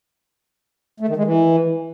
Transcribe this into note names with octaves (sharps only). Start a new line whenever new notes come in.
A3
D#3
G#3
E3